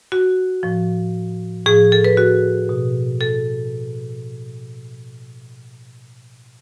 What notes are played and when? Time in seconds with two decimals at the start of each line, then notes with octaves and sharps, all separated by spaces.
0.12 F#4
0.63 A2 F3
1.66 A2 F3 G#4
1.92 A4
2.04 B4
2.17 F#4
2.69 B2
3.21 A4